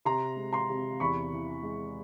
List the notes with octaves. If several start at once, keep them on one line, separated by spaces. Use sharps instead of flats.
C3 A#5 C6
G#3
A#5 C6
C3
E2 B5 C#6
E3
G#3